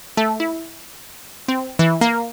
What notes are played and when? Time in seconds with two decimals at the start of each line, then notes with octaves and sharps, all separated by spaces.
0.17 A3
0.40 E4
1.48 C4
1.79 E3
2.01 A#3